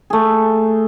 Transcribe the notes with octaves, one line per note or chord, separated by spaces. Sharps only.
A3 G#4